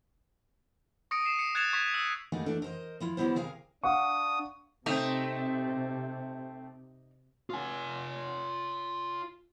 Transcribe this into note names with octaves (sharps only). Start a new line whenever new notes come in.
C#6 D#6 A#6 C#7 D7
C7 E7
C#7
F#6 G#6 A6 C#7 E7 F7
C#6 G#6 A6 B6
E6
G3 A3 A#3 D#4 F#4 G#4
E3 A3 D4 A4
A#4 C5 D#5
F3 E4 F4
F#3 G3 B3 E4 C5
C3 G#4 A#4 F5
D4 F5 F#5 C#6 D#6
C3 A3 C4 D#4
F4 G#5